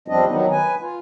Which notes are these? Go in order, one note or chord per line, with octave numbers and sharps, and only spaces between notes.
E2 F3 G3 C4 D4 D#5
D#3 F#3 B3 D#4
B4 G#5
F4